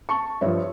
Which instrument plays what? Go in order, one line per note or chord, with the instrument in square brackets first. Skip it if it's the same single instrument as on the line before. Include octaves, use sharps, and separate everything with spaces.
[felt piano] A5 C#6
G2 F3 C#5 E5